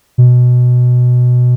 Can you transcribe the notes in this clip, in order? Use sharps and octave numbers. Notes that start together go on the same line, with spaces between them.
B2